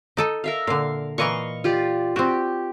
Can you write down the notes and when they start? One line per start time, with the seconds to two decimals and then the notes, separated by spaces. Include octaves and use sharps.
0.17 D#4 A4 D#5
0.44 A#4 E5 F5
0.67 A#2 D3 F5
1.18 A#2 E3 A#4 D#5 F5 C#6
1.64 F4 G4 D5
2.16 C4 F#4 G4